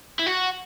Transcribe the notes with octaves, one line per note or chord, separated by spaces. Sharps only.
E4
F#4